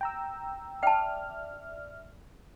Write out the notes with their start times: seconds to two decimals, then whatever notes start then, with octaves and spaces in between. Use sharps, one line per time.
0.01 G5 A#5 E6
0.83 D5 E5 G5 A5 F6